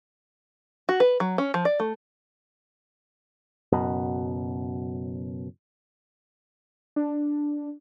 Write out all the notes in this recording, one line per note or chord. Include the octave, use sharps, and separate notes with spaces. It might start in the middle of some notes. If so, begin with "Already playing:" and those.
F#4
B4
F#3
C#4
F3
D5
A3
F#1 F#2 B2
D4